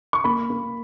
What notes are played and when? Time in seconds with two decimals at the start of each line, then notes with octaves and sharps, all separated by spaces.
0.13 C#6
0.24 A#3 B5
0.50 A#3